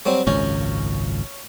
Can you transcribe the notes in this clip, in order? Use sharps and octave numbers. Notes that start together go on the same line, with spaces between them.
F#3 G3 C4
G#1 C#2 F#2 C#4